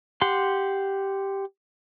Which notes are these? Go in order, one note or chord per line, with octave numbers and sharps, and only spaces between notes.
G4 F#5 C6